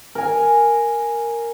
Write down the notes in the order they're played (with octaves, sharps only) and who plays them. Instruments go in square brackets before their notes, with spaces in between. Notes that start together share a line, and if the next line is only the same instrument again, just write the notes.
[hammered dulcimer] A#4 G#5